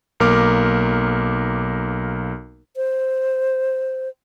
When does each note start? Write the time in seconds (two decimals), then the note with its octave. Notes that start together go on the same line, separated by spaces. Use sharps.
0.20 B1 A#3 A#4 D6 F6
2.76 C5